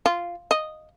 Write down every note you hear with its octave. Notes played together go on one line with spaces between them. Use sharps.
F4
D#5